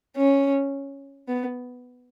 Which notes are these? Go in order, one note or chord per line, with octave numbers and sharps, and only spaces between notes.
C#4
B3